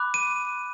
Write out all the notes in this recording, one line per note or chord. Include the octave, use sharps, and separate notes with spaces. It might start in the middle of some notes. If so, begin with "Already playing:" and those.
Already playing: B5 D6 F#6
D#7